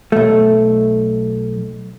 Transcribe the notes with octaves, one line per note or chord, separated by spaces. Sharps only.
B1 A3